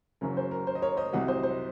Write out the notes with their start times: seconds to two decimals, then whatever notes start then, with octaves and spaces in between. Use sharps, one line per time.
0.21 F#1 F#2 C#3 F#3 A#4
0.37 C5
0.51 A#4
0.67 C5
0.75 D#5
0.82 A#4 C#5
0.97 C5 D#5
1.13 C2 C3 F#3 D#5 F#5
1.28 C5 D#5
1.43 C5